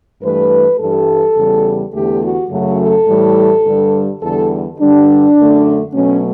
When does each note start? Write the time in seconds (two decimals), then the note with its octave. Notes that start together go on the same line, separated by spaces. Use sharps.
0.22 G2 E3 A3 B4
0.79 G2 E3 G3 A4
1.37 E2 C#3 G3
1.94 E2 D3 A3 G4
2.22 F#4
2.51 F#2 C#3 F#3 A3 F#4
2.80 A4
3.08 A2 E3 G3
3.66 G2 D3 G3
4.23 E2 D3 G3 A4
4.80 G2 D3 G3 D4
5.37 F#2 D3 A3
5.94 B2 F#3 A3 C#4